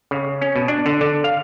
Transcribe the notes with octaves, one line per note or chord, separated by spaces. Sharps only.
C#3
C#4
B2
D4
D3
D3
F5